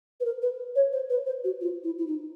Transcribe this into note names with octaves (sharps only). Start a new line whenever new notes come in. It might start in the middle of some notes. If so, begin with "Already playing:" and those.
B4
A#4
B4
C#5
C5
B4
C5
F#4
F4
E4
E4
D#4